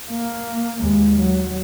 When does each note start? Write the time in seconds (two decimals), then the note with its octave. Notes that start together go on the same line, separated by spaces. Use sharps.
0.11 A#3
0.82 D#2 G#3
1.16 F#3